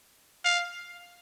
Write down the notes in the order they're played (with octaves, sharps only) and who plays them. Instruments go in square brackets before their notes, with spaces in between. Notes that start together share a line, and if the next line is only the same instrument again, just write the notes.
[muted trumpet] F5